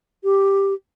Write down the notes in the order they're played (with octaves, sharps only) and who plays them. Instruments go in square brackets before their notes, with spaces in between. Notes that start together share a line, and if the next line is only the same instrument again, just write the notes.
[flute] G4